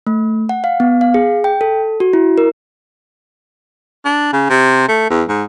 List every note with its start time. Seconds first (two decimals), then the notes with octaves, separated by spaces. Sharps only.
0.07 A3
0.49 F#5
0.64 F5
0.80 B3
1.01 F5
1.14 G#4
1.44 G5
1.61 A4
2.00 F#4
2.13 E4
2.38 A#4
4.05 D4
4.33 C#3
4.50 C3
4.88 A3
5.10 E2
5.29 G#2